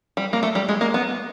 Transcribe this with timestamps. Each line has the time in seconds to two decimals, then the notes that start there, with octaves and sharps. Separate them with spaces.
0.17 G3
0.33 A#3
0.43 A3
0.55 G3
0.69 G#3
0.81 A#3
0.94 B3